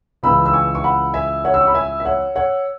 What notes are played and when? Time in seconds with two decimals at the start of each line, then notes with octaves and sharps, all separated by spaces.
0.23 C#2 C#3 E3 B5 E6
0.46 E6
0.53 G#5 C#6
0.75 C#6
0.84 F#5 B5
1.14 E5 G#5
1.45 C#5 F#5
1.54 E6
1.60 C#6
1.67 B5
1.74 E5 G#5
2.00 E5
2.05 C#5 F#5
2.36 C#5 F#5